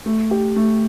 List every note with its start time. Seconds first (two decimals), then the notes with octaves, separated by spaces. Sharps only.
0.06 A3
0.31 G4
0.56 A3